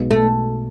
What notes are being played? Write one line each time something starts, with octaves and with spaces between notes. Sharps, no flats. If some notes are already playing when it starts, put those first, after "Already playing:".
Already playing: B1 B2 G#3
A3